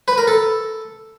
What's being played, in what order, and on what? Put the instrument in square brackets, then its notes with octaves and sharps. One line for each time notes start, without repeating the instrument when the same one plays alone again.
[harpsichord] B4
A#4
A4